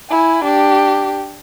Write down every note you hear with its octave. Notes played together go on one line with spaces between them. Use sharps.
E4 G#5
D4 G4